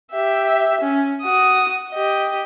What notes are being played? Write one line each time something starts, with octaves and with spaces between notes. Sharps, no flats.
G4 E5
C#4
F#4 D#6
G4 D#5